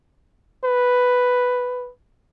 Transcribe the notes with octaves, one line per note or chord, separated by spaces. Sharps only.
B4